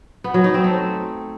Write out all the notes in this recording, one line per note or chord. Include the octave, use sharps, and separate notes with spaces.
B3
F#3
D#4
C4
A3